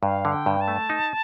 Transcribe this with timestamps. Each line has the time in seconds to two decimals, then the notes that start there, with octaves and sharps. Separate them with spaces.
0.03 G2 F5
0.25 D3
0.32 G5
0.46 G2
0.61 A5
0.68 A3
0.90 D#4